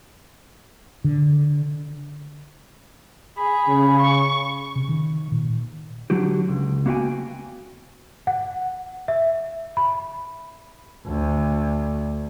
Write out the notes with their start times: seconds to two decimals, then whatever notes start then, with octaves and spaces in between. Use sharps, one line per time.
1.04 D3
3.37 G#4 B5
3.67 C#3
4.00 C#6
4.76 C3
4.89 D#3
5.32 A#2
6.10 D3 F#3 F#4 G4
6.48 C#2
6.86 A#3 B3 F#4 E5 G5 G#5
8.27 F#5
9.08 E5
9.77 B5
11.07 D2